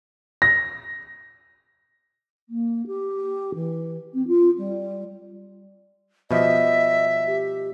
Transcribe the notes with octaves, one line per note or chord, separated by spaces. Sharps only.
A#6
A#3
G4
E3
C4
F4
G3
B2 F3 G3 D#5 E5
G4